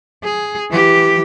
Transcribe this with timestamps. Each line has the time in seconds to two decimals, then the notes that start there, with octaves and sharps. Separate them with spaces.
0.23 G#4
0.70 E3 G4